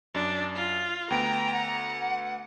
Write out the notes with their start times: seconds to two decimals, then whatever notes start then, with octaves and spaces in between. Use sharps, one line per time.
0.14 F#2 D4
0.55 F4
1.10 D2 B3 G5 A#5 D7
1.53 F#5